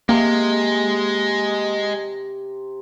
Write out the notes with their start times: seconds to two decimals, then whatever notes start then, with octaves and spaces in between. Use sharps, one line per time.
0.09 C3 G#3 A#3